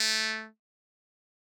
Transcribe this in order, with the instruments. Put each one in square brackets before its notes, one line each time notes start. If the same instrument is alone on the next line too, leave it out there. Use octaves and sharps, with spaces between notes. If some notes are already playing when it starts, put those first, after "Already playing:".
Already playing: [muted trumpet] A3